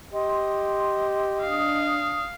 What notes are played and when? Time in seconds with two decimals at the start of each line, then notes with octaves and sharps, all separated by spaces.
0.13 G4 D#5 C6
1.42 D4 F5 D#6